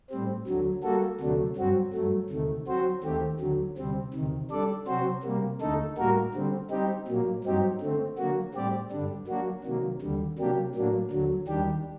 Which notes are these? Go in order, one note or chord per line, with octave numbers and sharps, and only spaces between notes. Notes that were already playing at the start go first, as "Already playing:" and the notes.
A2 G3 C4
D2 D3 F#3
G3 A#3 F#4 A4
D2 C3 F#3 A3 D4
G2 F#3 C4 F#4
G2 F#3 A3
D2 C3 D#3 A3
F#3 C4 F#4 C5
D#2 D#3 A3 C4 G4
D2 D3 F#3
D2 C3 G3 C4
D2 C3 D#3
G3 D4 A4 D5
C3 F#3 C4 F#4 C5
C3 G3 A#3
D2 D3 A3 D#4 A4
A2 G3 A#3 F#4 A#4
D3 G3 C4
G3 C4 D#4 G4
A#2 F#3 A#3
G2 F#3 C4 D#4 G4
D3 A3 C4
D3 F#3 A#3 F#4
A2 G3 C4 G4 D5
G2 D3 G3 D4
F#3 A#3 D4 F#4
C3 D#3 F#3 A#3
D#2 D3 G3
C3 F#3 A#3 D4 G4
A2 F#3 A#3 D4
D2 D3 F#3
D#2 D#3 G3 D4 G4